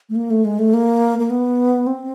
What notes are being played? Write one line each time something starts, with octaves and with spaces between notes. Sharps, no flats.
A3
A#3
A3
G#3
A3
A#3
A#3
B3
C4